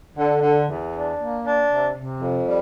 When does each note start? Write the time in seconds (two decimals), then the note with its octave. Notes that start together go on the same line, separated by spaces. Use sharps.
0.16 D3
0.41 D3
0.67 E2
0.92 D4
1.18 A#3
1.44 D4
1.69 C3
1.95 C3
2.20 F2
2.45 G3